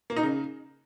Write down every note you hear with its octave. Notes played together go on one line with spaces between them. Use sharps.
A#3
D#4
C#3